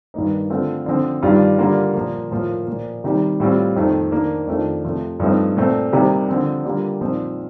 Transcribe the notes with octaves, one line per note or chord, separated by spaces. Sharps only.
G2 D#3 A#3 D#4
D3 A3 C4 F4
D3 F3 C4
G2 D#3 G3 D4 F4
D3 G3 A#3 F4
A#2 F3 A#3
A2 F3 A#3 F4
A#2 F3 A#3
C3 D#3 G3
A2 G3 C4 F4
F2 D#3 A3
D#3 A#3 D4
F2 D#3 A3 D4 F4
C3 F3 A3
G2 F3 A3 C4 D#4
A#2 A3 C4
C3 G3 A#3 D#4
D3 F3 C4
D3 G3 A#3 F4
A#2 F3 C4 D#4